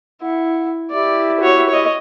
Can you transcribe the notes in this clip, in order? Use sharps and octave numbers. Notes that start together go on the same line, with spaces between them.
E4 F#5
E4 G4 D5 E5
F#4 C#5
C#5 D#5